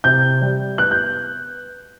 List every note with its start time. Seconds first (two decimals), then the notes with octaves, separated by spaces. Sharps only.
0.04 C3 G6
0.41 G3
0.78 B3 F#6
0.91 G6